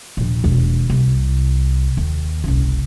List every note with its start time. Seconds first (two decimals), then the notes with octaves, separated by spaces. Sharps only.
0.17 A#1 D#2
0.44 E1 D#2
0.90 C2
1.97 D#2
2.44 F#1 C2